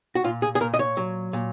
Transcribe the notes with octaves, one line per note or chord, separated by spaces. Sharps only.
F#4
A#2 F4
G#4
G#4
A#2 A#4
D#5
C#5
F#3
A#2